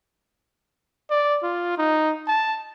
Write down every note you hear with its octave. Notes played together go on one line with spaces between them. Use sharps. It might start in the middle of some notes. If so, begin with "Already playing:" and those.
D5
F4
D#4
A5